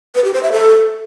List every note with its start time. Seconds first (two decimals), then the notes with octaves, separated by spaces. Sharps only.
0.15 B4
0.24 G4
0.34 C5
0.43 E5
0.52 A4